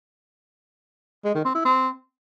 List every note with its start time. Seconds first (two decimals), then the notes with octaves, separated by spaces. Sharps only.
1.25 G#3
1.35 D#3
1.45 C4
1.55 E4
1.65 C4